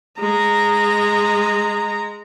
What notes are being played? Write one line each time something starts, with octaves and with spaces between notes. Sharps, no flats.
G#3 A#5